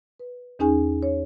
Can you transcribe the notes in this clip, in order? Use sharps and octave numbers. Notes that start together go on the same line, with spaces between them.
B4
E2 C#4 D#4 G#4 G#5
C#5